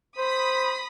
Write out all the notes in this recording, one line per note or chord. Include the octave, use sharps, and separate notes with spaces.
C5 B5 D#6 B6